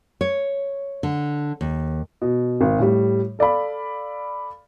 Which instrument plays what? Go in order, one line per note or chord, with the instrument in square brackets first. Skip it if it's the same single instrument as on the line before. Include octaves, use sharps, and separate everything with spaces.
[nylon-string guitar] C#5
D3
D#2
[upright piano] B2
G#1
A2 G3
A4 D5 F5 B5